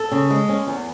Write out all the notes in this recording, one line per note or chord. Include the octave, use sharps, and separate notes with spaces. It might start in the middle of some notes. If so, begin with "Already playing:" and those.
Already playing: A4
C#3
G#3
C#4
E2